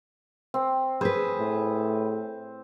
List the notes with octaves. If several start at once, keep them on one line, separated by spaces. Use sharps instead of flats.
C4
G#4 B4 C5
A2